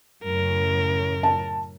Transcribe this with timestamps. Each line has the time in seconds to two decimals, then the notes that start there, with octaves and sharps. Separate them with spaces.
0.24 F#2 A2 C#3 A#4
1.23 A5